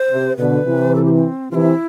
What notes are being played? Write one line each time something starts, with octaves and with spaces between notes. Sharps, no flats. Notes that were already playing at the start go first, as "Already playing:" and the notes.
Already playing: C5
C3
B2 D3 B4
C3 E3
A4
G4
C4
C3 E3 E4 F4